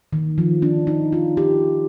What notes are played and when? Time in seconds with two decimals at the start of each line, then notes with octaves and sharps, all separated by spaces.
0.13 D#3
0.38 F3
0.62 D4
0.87 D#4
1.12 F4
1.37 G4